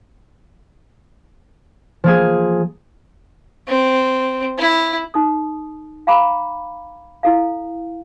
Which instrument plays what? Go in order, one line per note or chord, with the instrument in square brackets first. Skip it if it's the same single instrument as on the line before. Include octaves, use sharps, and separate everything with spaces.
[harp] F3 A#3 G#4
[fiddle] C4
E4
[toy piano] D#4 A4 D#6
F5 G5 A#5 B5 D6
E4 A4 F5